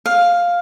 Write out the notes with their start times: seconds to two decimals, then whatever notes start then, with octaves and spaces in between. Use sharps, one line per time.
0.06 F5